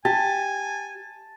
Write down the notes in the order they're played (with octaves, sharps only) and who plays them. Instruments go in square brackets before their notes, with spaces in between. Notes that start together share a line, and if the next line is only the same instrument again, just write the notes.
[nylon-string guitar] G4 [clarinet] G#5 [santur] A5